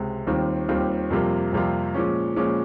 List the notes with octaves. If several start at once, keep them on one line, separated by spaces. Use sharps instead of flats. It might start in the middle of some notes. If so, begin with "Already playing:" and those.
Already playing: C#2 C3 G#3
D#2 D#3 G3 C4 F4
D#2 D#3 G3 C4 F4
F2 C3 G3 A#3 F4
F2 C3 G3 A#3 F4
A#2 F3 G#3 C#4
A#2 F3 G#3 C#4